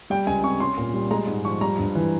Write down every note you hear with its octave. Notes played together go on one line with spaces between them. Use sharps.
G3 G5
C#2 G#5
C3 C#6
C#4 C6
A#2
G3
G#3 A#5
G#2
F3 C#6
G3 A#5
G2
E3